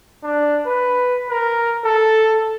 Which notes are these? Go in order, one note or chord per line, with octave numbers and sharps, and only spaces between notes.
D4
B4
A#4
A4